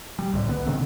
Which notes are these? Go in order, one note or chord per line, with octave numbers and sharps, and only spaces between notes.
G3
C2 A2 D3
B3
B2 D3 D#3 C4